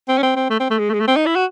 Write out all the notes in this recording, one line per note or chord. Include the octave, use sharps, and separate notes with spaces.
C4
C#4
C4
C4
A3
C4
A3
G#3
A3
G#3
A3
C4
D#4
E4
F#4